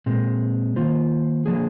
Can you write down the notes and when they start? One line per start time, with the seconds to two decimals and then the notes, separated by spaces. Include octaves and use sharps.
0.06 A#2 G#3 C4
0.76 D#3 A#3 F4 C5
1.46 D3 F3 A#3 D4 G#4